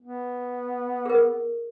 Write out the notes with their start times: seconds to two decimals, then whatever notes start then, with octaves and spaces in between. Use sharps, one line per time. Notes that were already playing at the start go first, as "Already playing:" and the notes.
0.01 B3
1.06 G#4 A#4